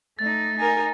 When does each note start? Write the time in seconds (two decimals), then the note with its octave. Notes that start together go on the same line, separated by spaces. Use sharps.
0.19 A3 D#4 A6
0.58 D#4 A#4 G#5